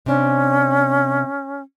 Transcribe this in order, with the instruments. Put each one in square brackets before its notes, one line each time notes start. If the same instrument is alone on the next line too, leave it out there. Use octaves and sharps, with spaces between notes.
[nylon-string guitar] C3 D4 [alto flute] C#4